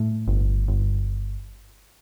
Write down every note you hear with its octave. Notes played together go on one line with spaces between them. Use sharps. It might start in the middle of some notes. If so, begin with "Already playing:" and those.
Already playing: A2
G1
G1